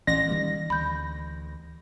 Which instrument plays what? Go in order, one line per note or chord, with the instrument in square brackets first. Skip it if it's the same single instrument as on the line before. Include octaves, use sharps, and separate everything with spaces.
[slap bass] A1 [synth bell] E3 [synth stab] A#6
[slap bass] D#3 G3 A#3
[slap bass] D2 [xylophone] B5 G6